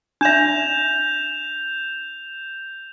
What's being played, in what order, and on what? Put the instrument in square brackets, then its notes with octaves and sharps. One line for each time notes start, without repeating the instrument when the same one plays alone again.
[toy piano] D4 E5 [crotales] G6 E7 F7